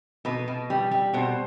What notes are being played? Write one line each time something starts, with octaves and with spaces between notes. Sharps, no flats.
B2 B4
B2
G3
G3
B2 C5